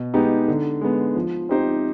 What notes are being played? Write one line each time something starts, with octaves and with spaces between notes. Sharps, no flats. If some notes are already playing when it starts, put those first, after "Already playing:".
Already playing: B2
G#3 B3 D#4 G4
D3
G#3 B3
F3
C4 D#4 G4 C5